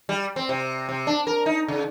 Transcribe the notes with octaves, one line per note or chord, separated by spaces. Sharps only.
G3
C4
C3
C3
D4
A#4
D#4
C#3